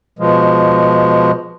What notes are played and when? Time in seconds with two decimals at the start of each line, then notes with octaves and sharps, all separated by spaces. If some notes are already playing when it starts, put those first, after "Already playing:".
0.19 B2 F3 G#3